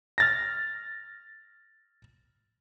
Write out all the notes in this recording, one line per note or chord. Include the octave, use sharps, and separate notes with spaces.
F6 A6 A#6